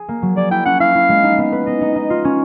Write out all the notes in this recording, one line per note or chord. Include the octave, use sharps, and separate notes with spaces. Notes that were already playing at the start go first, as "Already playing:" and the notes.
Already playing: G#4
A#3
F#3
G#4 D5
E4 G5
C#4 F#5
E4 F5
E4
G#3
D#4
B3
B4
B3 D#5
D#4
D#4
F4
C#4